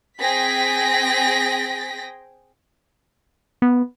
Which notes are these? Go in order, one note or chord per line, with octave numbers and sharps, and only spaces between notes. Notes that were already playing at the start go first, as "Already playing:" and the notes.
C4 G#4 G5 A#6 B6
B3